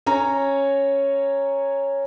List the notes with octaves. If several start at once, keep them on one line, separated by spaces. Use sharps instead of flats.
C#4 C#5 A#5